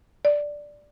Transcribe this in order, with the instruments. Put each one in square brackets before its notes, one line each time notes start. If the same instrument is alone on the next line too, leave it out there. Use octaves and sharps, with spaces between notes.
[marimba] D5